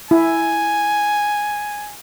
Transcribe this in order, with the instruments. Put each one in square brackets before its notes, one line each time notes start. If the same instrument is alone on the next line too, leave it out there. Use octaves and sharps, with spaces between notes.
[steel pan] E4 [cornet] G#5